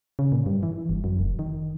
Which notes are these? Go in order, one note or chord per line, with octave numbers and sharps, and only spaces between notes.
C#3
A#2
G2
E3
G1
F#2
F1
D#3